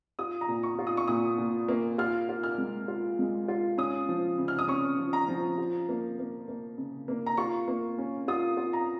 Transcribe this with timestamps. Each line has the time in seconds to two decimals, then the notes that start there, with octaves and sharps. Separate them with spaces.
0.19 F4 D#6
0.41 A#5
0.48 A#2
0.63 C#6
0.79 F4
0.87 D#6
0.97 C#6
1.08 A#2 D#6
1.38 A#2
1.68 A#3
1.98 F4 F6
2.29 F4
2.43 F6
2.58 G#3
2.88 F4
3.19 G#3
3.48 F4
3.78 C#4 D#6
4.09 F3
4.38 C#3
4.48 F6
4.59 D#6
4.68 C#4 C#6
4.98 F3
5.13 A#5
5.28 F3
5.58 F4
5.89 A#3
6.19 A#3
6.48 A#3
6.77 C#3
7.08 A#3
7.26 A#5
7.37 F4 C#6
7.68 A#3
7.98 C#4
8.28 F4 D#6
8.57 F4
8.73 A#5